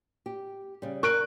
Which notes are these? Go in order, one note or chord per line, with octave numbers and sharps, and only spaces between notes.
G4
C#3 G3
A#4 C#6 F#6 D7